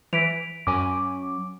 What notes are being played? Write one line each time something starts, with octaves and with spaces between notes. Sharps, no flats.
E3 B6 D7 F7
F#2 F#3 C#4 G#5 D6